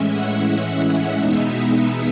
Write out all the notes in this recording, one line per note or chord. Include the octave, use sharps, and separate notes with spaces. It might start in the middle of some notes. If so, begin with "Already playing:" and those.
Already playing: A2 E3 G#3 C#4 E5
F#5
E5
F#5
E2 B2 G#3 B3 D#4 E5